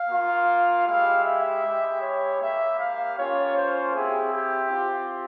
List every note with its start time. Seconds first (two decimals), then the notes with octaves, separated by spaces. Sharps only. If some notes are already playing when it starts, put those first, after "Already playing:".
Already playing: F5
0.08 A#3 F4
0.85 G#3 E4 G4 F5
1.24 E5
1.63 G#3 E4 G4
2.01 C#5
2.39 A#3 E4 G4 E5
2.77 F5
3.17 A#3 C#4 F4 C#5
3.55 C5
3.93 C4 E4 G4 G#4
4.32 G4
4.70 C4 F4